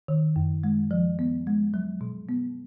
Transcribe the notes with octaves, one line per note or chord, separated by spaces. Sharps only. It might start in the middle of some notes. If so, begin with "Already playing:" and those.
D#3
F#2
G#3
F3
B3
G#3
F#3
B2
B3